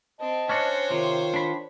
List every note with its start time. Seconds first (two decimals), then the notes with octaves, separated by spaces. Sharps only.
0.20 C4 D#5 A5
0.49 C#4 D4 F#4 C5 C#5
0.91 C3 D#3 F4
1.34 D4 B5